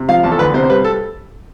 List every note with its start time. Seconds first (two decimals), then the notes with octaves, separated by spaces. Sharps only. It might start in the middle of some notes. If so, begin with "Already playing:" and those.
Already playing: C3
0.08 F3 F5
0.23 E2 A5
0.31 A4
0.39 D2 B4
0.54 C3 C5
0.64 C5
0.70 G3 B4
0.84 A4